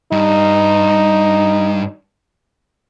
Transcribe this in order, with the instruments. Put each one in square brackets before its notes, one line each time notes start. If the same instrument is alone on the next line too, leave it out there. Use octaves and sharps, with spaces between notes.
[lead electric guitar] G2 [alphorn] D#4